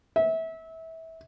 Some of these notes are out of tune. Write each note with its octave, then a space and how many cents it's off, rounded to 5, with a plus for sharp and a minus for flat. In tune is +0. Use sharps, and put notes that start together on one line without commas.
E5 -25